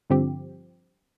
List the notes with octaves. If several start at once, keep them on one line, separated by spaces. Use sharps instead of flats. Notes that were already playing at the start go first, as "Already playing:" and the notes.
G2 D3 F3 C4 G4